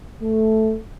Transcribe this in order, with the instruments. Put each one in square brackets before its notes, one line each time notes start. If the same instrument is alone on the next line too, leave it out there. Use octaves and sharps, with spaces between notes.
[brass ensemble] A3